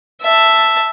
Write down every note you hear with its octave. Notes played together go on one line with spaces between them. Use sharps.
E5 A5